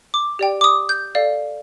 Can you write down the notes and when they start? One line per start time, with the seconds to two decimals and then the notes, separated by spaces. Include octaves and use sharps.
0.14 D6
0.39 G4 D5 G5
0.61 D6
0.64 D#6
0.89 G6
1.15 A4 D5 F5